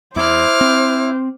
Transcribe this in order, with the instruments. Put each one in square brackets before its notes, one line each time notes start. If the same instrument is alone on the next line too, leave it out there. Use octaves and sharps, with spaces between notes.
[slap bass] E2 [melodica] E4 [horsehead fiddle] C5 [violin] D6 F6
[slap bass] C4